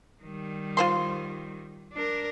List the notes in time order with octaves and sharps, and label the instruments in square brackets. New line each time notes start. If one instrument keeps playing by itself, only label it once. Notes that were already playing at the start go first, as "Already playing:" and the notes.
[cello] D#3 G3
[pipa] F4 C5 C6
[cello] D4 A#4